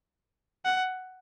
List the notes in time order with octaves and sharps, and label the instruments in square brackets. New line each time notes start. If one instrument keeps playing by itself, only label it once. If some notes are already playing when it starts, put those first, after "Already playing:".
[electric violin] F#5